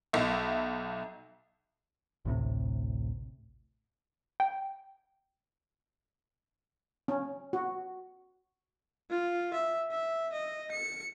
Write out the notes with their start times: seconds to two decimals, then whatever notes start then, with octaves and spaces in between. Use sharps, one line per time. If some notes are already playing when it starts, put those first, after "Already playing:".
0.13 B1 E5
2.25 A1 D2 A2 C3
4.40 G5
7.08 C#4
7.53 F#4
9.11 F4
9.54 E5
9.92 E5
10.33 D#5
10.71 C#7